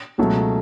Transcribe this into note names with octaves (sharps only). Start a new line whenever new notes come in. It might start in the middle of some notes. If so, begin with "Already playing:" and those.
C#2 B2 F#3 A3